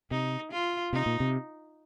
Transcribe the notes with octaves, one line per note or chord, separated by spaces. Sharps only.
C3 D#4
F4
C3 D#4
A#2
C3